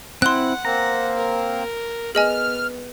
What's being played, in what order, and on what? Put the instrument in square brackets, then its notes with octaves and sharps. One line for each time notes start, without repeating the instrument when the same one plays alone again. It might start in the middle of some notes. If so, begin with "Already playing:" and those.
[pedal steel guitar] C4 E4 [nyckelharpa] F#5 [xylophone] C6 F#6
[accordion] A#3 C4 [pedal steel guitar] A#5
[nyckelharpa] A#4
[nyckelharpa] B3 [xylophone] G#4 D#5 G#5 [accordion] F6